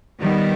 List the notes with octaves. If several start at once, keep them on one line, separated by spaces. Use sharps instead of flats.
D#3 G3 B3